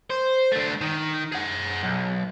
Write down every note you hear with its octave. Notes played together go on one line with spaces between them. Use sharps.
C5
A3 D4
D#3
G#4 F#5
B1